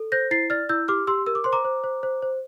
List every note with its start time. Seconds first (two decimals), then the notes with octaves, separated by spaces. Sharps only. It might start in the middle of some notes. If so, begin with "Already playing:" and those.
Already playing: A4
0.12 C5 G6 A#6
0.31 E4 A6 C7
0.50 D5 F6 A6
0.69 E4 E6 G6
0.88 G4 D6 F6
1.07 G4 C6 E6
1.26 A#4 E6
1.35 D6
1.44 C5 C6
1.53 A#5 D6
1.65 C5
1.84 C5
2.03 C5
2.22 C5